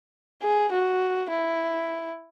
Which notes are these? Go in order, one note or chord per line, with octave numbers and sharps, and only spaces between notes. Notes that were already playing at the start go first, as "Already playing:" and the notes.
G#4
F#4
E4